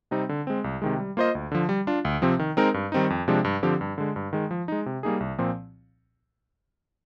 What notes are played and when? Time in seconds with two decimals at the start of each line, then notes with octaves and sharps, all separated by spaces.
0.11 C3 G3 C4 D#4
0.29 D3
0.47 G#3 C4
0.64 C2
0.82 C3 D#3 G#3
0.99 G3
1.17 A#3 F4 C5 D#5
1.35 D2
1.52 D3 F3
1.69 G3
1.87 D4 F4
2.05 D2
2.22 C3 F3 C4
2.39 D#3
2.57 G#3 C4 D#4 A#4
2.74 G2
2.92 D#3 G3 C4 D#4
3.10 F2
3.28 C3 F3 G#3 D4
3.44 G2
3.63 D3 F3 C4 G4
3.81 G2
3.98 D3 G#3
4.16 G2
4.33 D#3 G#3
4.51 F3
4.68 G#3 D#4
4.86 C3
5.03 G3 A#3 D#4 G#4
5.20 C2
5.38 A#2 F3 C4